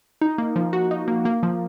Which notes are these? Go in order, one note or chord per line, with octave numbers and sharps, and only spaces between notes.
D#4
A#3
F3
F#4
D#4
A#3
A#3
F3